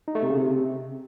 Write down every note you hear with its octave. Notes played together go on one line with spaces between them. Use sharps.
D#4
A3
C3
C#3
C3